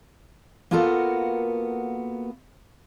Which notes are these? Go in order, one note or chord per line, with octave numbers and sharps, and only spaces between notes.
A#3 B3 F4 F#4 A4 A#4